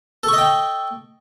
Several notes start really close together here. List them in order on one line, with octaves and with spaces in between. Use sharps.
A4 C#6 D#5 G5